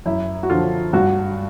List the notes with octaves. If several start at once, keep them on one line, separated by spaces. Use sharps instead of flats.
F#2 E4
F#4
D3 F3 F4
G2 F#4